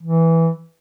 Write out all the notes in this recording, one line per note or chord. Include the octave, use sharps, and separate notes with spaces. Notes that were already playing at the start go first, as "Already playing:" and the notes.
E3